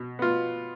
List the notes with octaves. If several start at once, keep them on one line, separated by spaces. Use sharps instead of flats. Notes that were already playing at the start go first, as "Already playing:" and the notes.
Already playing: B2
B3 F4